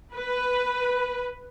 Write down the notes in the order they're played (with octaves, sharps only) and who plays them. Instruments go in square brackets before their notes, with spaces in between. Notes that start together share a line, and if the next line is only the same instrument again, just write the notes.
[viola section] B4